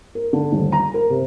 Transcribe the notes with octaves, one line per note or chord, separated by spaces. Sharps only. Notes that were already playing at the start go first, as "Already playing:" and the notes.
A#4
D3
D#1
A#5
A#4
C3